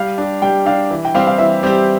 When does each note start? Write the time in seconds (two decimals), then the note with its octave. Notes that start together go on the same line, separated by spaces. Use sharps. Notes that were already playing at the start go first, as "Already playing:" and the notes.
Already playing: G3 F5
0.18 D4 G4
0.42 G3 G5
0.66 D4 G4 F5
0.91 E3
1.05 G5
1.14 G3 C4 G4 F5
1.27 F5
1.38 E3 E5
1.63 G3 C4 G4